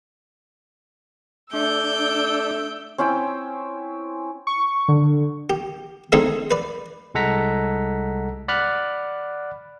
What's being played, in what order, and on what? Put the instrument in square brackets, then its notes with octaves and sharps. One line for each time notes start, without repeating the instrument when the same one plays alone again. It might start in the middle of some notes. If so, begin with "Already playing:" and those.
[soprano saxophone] A3 [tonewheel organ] D4 [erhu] E6 [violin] G6 D7
[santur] C4 C#4 E4 G5
[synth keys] C#6
D3
[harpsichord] G4
D3 G#3 C4 D#4 G#4 A4
B4 D5
[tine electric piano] C2 G#3 A4 F#5 A#5 B6
D5 F#5 B5 F6 F#6